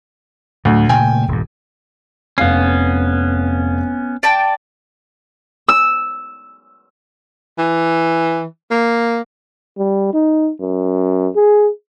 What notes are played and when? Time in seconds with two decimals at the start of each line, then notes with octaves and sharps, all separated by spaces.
0.65 D2 A2 F#3
0.89 A#2 C#3 A3 G5 G#5
1.28 D#1 G2
2.38 F1 B3 C#4 F5 C7
4.23 D5 G5 A5
5.69 E6
7.58 E3
8.71 A#3
9.78 G3
10.13 D#4
10.60 F#2
11.36 G#4